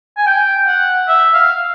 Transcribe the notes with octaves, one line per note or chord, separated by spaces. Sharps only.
G#5
G5
F#5
E5
F5